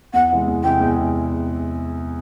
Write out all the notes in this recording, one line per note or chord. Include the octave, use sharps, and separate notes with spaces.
E2 F#5
C3 E3 G#3
E2
C3 E3 G#3 G5
E2
C3